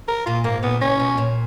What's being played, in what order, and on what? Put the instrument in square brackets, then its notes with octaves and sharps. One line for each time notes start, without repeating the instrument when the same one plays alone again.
[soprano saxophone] A#4
[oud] A#2 [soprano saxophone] F4
[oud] G#2 [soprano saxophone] A#3
[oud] A#2 [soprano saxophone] B3
[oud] C#3 [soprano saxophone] C#4
[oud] B2
A#2